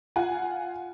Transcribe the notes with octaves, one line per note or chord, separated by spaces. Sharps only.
F4 F#5 G#5